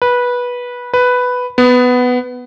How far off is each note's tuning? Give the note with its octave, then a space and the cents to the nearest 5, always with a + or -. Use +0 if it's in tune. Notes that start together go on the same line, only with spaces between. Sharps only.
B4 -15
B4 +5
B3 +10